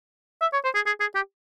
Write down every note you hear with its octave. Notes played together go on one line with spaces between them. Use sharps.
E5
C#5
C5
G#4
G#4
G#4
G4